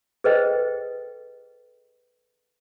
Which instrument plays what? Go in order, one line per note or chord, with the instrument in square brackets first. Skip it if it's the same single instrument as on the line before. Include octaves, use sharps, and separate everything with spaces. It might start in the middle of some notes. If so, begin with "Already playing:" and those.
[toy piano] G#4 A4 B4 C5 D#5 G5